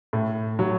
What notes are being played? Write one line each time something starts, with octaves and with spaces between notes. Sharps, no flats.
A2
F#3